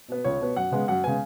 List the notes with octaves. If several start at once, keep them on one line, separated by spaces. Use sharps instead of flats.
B2 B3
C#2 C#5
B2 B3
F#2 F#5
C#3 G#3 B3
F#2 F#5
C#3 G#3 B3 G#5